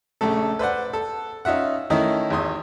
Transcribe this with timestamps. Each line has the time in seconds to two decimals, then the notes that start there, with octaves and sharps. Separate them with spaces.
0.21 A#1 C#3 A3 A4
0.59 B4 C5 D5 F#5
0.93 A4
1.45 C#4 D#4 F4 E5 F#5
1.90 D#3 A3 C#4 D#4 E4
2.30 G#1 E2 C6 D#6